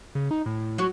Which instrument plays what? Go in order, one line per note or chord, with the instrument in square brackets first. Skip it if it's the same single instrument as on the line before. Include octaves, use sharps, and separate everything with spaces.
[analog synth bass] C#3
D#4
A2
[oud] F#3 F#4